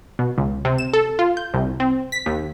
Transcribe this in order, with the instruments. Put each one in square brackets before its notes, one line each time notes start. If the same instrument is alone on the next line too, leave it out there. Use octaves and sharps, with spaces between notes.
[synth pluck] B2
C#2
C3
E7
A4
F4
G6
C2
C4
B6
D#2